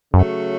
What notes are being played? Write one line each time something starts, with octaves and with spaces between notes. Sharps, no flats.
F#2 C#3 F#3 A3